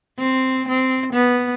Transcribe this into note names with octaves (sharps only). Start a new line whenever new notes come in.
C4
C4
B3